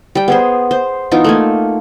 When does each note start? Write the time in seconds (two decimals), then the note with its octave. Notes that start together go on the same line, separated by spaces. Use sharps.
0.15 G3 G5
0.28 B3 G#4 C5
0.71 C5
1.11 E3 B3 D#4 F4
1.24 A3 A#3 G#5